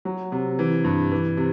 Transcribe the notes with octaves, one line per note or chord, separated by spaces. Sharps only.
F#3
C3
E3
G2
E3
C3